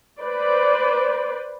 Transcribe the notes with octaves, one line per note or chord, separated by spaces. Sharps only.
B4 C5 D5